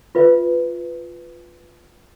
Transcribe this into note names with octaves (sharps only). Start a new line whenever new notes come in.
F4 B4 E5